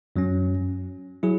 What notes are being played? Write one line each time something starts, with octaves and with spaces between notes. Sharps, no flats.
F#2 F#3 C#4
F#3 E4 G#4